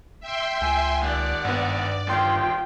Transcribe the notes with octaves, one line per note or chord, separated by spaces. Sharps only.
E5 G5 C6
C#2 G#5
D#2 D5 F#5
G#1 G2 B3
G1 D#2 F4 G5 C6